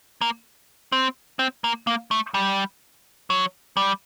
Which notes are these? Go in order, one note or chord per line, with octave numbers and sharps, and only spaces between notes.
A#3
C4
C4
A#3
A#3
A3
G3
F#3
G3